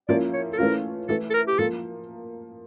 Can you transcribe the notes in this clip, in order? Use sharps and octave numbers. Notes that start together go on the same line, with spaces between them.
F3 A#3 C#4 E4 D5
C#5
A4
E3 A3 C#4 F4 A#4
E3 A3 E4 A4
A4
A#4
G4
F3 A#3 A4